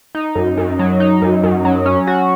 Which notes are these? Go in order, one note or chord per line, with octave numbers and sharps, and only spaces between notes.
D#4
F#2
F#2
F#3
D#4
F#2
F#2
F#3
C#4
F#4